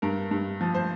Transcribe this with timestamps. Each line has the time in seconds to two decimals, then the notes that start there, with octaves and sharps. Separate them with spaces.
0.02 G2 A#4
0.31 G2
0.61 F3
0.75 C5